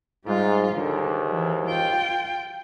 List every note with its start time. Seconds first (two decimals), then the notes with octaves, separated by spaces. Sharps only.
0.25 G#2 G3 F4
0.74 D#2 G#2 D3
1.29 E3
1.67 F4 G5